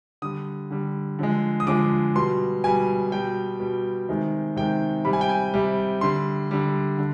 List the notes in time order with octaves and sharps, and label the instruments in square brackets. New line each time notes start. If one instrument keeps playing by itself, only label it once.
[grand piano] D3 G3 D#6
D3 G3
D3 F3 G#3
D#6
D3 F3 G#3 D6
B2 G3 C6
B2 G3 G#5
B2 G3 G5
B2 G3
C3 D#3 G#3
C3 D#3 G#3 G5
C3 G3 B5
G#5
G5
G#5
C3 G3
D3 G3 C6
D3 G3
D3